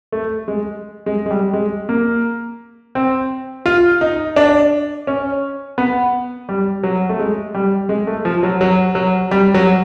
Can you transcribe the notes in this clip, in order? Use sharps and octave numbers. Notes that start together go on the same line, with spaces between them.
A3
G#3
G#3
G#3
G3
G#3
A#3
C4
F4
D#4
D4
C#4
B3
G3
F#3
A3
G#3
G3
G#3
A3
F3
F#3
F#3
F#3
G3
F#3